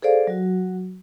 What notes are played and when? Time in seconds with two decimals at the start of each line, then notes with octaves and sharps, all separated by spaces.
0.02 G#4 A4 C5 D5 F5
0.27 F#3 F#4